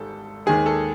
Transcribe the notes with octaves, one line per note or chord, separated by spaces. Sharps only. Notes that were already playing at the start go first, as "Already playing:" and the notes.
Already playing: G#1 G#2 G3 A4
D#2 D#3 G#3 G#4
A4